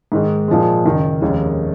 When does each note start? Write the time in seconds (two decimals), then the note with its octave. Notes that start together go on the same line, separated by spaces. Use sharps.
0.12 G#2 D#3 G#3
0.48 A#2 F3 G#3
0.85 F#1 F#2 D#3
1.21 F1 D#2 D#3 G#3 C#4